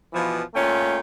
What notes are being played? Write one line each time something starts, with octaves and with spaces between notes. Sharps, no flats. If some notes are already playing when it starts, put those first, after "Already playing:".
B2 E3 F3
A#2 A3 C#4 F4 G5